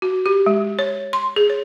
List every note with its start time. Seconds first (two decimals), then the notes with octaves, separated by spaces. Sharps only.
0.02 F#4
0.26 G4
0.46 G#3
0.79 C#5
1.13 C6
1.36 G#4
1.50 C#5